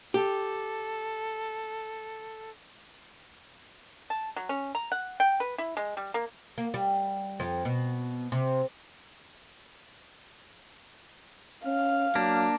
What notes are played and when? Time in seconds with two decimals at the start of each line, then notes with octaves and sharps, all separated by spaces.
0.14 G4 A4
4.10 A5
4.36 F#3
4.49 C#4
4.75 A#5
4.92 F#5
5.20 G5
5.40 B4
5.58 E4
5.77 G#3
5.97 G3
6.14 A#3
6.58 A#3
6.74 G3
7.40 F2
7.65 B2
8.32 C3
11.65 C#4 F5 F6
12.15 F#3 A#3 D4